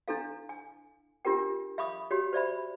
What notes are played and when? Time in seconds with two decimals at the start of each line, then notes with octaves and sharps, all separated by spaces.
0.08 D4 E4 A4 F5
0.49 G#5
1.25 D4 F4 G4 A#4 G5
1.78 E5 F5 B5 C#6 D#6
2.11 F#4 G4 C#5
2.33 C5 D5 E5 B5